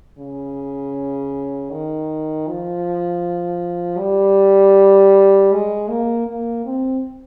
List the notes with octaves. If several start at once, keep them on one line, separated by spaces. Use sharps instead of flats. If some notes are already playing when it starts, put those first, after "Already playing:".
C#3
D#3
F3
G3
G#3
A#3
A#3
C4